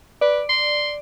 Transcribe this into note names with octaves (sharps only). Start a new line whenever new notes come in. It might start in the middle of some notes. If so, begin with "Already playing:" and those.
B4 D5
C6